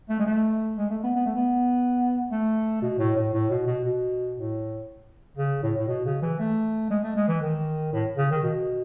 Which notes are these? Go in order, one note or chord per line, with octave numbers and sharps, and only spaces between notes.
A3
G#3
A3
G#3
A3
B3
B3
A3
B3
A3
B2
A2
A2
A2
B2
B2
B2
A2
C#3
A2
A2
B2
C#3
E3
A3
G#3
A3
G#3
E3
D#3
A2
C#3
D#3
B2